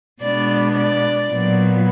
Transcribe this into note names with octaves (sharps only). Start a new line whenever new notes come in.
B2 G#3 B3 D4 D5
D5
A#2 F#3 B3